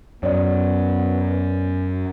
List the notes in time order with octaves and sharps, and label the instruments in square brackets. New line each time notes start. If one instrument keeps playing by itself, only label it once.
[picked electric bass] F#2 [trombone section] B3 [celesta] C#5 D5